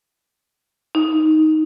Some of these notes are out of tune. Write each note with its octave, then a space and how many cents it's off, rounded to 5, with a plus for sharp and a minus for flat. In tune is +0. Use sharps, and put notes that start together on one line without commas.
D#4 +5